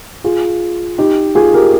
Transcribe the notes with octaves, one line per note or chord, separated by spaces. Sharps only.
F4 G#4
D#4 G4
F4 G#4
G4 A#4